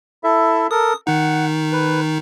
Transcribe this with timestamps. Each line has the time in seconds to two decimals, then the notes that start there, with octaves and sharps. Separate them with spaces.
0.24 E4 A4 E5
0.71 A4 A#4 D#6
1.07 D#3 D#4 F#5
1.72 B4